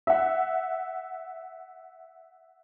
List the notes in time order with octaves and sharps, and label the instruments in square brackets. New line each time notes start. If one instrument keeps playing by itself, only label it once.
[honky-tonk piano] E5 F#5